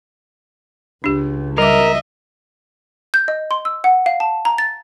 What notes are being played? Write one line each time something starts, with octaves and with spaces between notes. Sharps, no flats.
C#2 D4 G4
G3 A#4 D#5 E5 D6
G6
D#5
C6
E6
F#5
F5
A5
A#5
A6